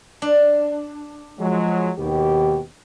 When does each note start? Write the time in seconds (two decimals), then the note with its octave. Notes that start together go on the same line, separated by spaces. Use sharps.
0.22 D4
1.39 F3 F#3 G#3
1.98 D#2 B2 G4